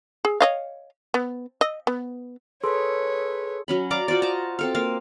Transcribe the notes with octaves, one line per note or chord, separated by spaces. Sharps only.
G#4
C#5 D#5 F5
B3
D#5
B3
G#4 A4 B4 C#5 C6
F#3 C#4 B5
D5 F5 A#5 D6
F4 F#4 C5 D5
D#5 A5 A#5
C4 A4 F5
A#3 F5